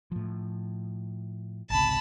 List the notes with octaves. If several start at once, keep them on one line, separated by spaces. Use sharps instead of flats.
A2 F3
G#1 C#2 C3 A5 B5